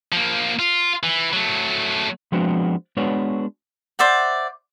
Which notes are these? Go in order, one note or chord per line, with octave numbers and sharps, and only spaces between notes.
F3 A#3
F4
E3
F#3 A3
F3 G#3 B3 C4 D4 F#4
G#3 B3 D4 F#4 B4 C#5
C5 D5 E5 F#5